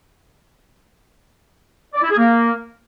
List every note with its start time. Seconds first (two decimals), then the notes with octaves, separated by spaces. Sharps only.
1.94 D5
2.02 E4
2.10 G#4
2.17 A#3